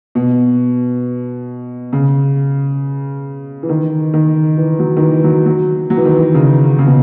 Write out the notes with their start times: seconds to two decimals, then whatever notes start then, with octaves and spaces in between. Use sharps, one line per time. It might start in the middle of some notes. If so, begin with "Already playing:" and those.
0.15 B2
1.93 C#3
3.63 E3
3.69 D#3
4.14 D#3
4.57 E3
4.79 F#3
4.97 D#3
5.02 E3
5.24 F#3
5.46 F#3
5.90 F#3
5.97 E3
6.05 D#3
6.12 E3
6.34 C#3
6.79 C#3
6.87 B2